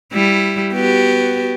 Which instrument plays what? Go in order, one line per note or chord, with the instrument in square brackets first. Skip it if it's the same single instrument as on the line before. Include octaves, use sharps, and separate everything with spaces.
[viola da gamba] G3 E4
B3 F#4 G4